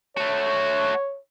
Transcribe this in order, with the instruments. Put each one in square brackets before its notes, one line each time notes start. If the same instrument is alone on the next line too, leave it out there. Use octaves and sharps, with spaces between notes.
[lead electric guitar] A3 F#4 [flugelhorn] C#5